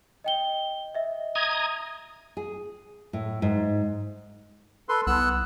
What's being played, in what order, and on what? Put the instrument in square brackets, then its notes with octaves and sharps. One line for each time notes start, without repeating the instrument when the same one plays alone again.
[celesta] D#5 G5 G7
D#5 E5
[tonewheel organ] A#5 D#6 G#6
[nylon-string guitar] G#4
A2
G#2
[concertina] A4 B4 C6
[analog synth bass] C2 [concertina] B3 E6 F#6